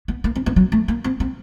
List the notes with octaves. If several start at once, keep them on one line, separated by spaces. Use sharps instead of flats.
B3
A#3
C4
B3
F#3
A3
A#3
C4
C4